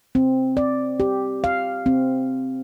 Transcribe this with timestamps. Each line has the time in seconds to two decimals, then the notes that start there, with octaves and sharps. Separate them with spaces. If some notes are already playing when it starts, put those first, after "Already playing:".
0.15 C4
0.57 D5
1.00 G4
1.44 F5
1.86 C4